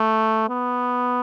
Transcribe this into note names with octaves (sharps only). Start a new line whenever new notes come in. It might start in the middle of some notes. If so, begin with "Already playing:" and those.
Already playing: A3
B3